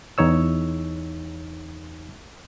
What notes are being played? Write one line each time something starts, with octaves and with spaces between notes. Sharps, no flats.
E2 D#4 C#5 E6